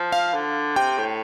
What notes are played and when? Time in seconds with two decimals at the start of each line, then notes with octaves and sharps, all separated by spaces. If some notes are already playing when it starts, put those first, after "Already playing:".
Already playing: F3
0.12 F5
0.34 D3
0.76 C3 G5
0.98 A2